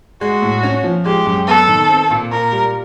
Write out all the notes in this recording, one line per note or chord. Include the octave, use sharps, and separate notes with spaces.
G#3 F#4
A2
C#4
F3
G#3 G4
F#2
B3 A4
D#3
C4
A#2
A#2 A#4
G3